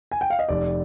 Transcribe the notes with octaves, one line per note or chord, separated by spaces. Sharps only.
G#5
G5
F5
D#5
F1 D5